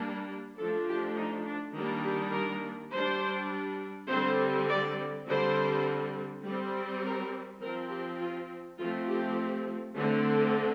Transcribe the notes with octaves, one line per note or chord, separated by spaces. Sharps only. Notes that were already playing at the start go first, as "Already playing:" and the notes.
Already playing: G3 A#3 D4
F3 A3 D4 A4
G4
D#4
D4
D#3 G3 A#3 D4
G4
A#4
G3 D4 C5
D3 G3 C4 C5
D5
D3 G3 C4 C5
G3 C4
A#4
F3 C4 A#4
G4
F4
F3 A3 C4 F4
G4
D3 A3 C4